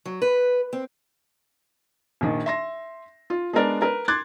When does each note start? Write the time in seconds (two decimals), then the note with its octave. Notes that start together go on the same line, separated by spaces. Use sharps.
0.06 F#3
0.22 B4
0.73 C4
2.21 A#1 D#3
2.46 E5 C6 A#6
3.30 F4
3.53 G#3 B3 D4 A#4 D5
3.82 A#4 B4
4.08 C6 D6 F#6 G#6 A6